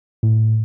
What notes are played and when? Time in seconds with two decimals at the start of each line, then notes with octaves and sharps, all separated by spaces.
0.23 A2